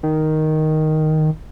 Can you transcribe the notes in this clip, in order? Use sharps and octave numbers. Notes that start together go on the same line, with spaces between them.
D#3